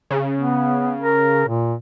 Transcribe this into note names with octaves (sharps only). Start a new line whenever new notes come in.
C#3
B3
A#4
A#2